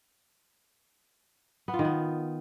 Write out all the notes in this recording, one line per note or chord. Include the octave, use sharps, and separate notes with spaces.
B3
F4
D#3
B3